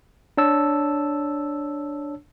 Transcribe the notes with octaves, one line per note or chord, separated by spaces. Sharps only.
D4 C#5 A5 E6